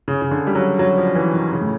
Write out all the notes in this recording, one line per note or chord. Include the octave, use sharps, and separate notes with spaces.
C#3
C#3
D3
G3
F#3
F#3
F3
E3
D#3
C#3
A2